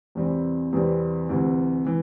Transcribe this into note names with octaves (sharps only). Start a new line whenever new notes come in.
E2 C3 E3 G3 C4
E2 C3 E3 G3 C4
D2 C3 E3
E3